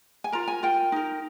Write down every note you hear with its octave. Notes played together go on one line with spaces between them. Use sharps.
G#5
F4 A#4 A#5
G#5
F4 A#4 G5
D#4 A#4